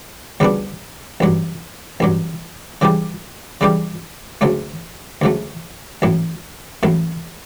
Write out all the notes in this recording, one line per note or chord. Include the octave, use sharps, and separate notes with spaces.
D2 C#3 G3 B3 D4
A1 G2 F#3
A1 G2 F#3
C#3 E3 G3 D4 G4
C#3 E3 G3 D4 G4
D2 C#3 F#3 A3
D2 C#3 F#3 A3
A1 A2 F#3
A1 A2 F#3